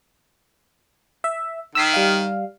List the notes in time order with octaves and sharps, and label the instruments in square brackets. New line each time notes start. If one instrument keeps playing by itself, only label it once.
[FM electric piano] E5
[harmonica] D#3 [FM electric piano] E6 B6 C7
[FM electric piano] G3 F5